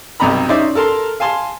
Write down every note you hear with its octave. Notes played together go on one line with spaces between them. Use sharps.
B1 G2 C3 D5 A#5 B5
C#4 D#4 C5 D5 E5
A4 A#4 A5 C6
F5 G#5 A5 C6